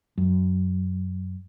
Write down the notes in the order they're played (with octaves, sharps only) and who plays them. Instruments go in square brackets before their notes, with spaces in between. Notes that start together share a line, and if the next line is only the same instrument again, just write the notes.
[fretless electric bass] F#2